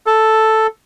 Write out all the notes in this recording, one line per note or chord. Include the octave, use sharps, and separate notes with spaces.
A4